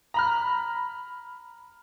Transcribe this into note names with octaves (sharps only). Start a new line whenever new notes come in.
A#5 B5 F6